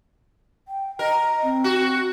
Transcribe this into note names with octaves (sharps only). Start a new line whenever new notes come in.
G5
A#4 D#5
C4
F#4